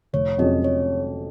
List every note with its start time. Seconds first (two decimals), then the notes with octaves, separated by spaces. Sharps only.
0.13 F1 C#5
0.38 F2 C3 F#3 C#4 D#5
0.64 C#5